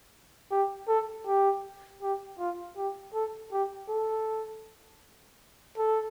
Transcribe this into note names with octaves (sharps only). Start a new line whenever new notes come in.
G4
A4
G4
G4
F4
G4
A4
G4
A4
A4